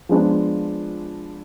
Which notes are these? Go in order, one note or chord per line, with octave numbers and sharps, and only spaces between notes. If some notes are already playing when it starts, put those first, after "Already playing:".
F3 G#3 B3 D4 F4